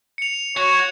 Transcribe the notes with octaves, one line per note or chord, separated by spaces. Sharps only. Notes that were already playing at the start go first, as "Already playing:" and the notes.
C#7 F7
F#4 C#5